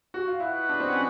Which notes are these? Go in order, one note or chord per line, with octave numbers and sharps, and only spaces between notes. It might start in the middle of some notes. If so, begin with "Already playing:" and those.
F#4
F4
E4 F#4 B4 D#5 F#5
D4
C4
C#4